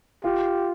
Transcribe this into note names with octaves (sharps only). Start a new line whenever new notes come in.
F4 G4